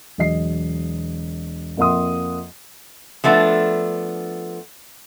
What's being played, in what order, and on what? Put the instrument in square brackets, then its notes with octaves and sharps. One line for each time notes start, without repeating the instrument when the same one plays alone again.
[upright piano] E1 F#3 D#5 C7
F2 A#3 E5 F#5 C6 D#6
[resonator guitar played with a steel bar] F3 A3 B3 D4